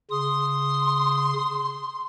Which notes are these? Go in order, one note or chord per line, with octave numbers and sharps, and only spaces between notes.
C#3 C6 D#6